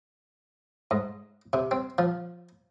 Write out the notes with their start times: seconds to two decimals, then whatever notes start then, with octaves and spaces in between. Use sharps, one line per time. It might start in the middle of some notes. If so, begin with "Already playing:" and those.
0.91 G#2
1.53 C3
1.71 C4
1.98 F3